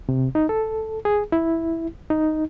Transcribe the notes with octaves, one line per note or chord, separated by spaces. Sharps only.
C3
D#4
A4
G#4
E4
D#4